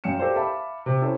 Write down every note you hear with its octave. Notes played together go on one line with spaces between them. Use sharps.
F#2 F5 G5 C#7 E7
G4 A4 A#4 C5 D5 F5
E5 F5 A5 B5 D6
C3
C#4 E4 A4 C5 C#5